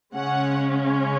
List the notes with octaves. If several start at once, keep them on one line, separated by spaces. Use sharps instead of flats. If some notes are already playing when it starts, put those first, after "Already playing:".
C#3 G#3 C#4 F#5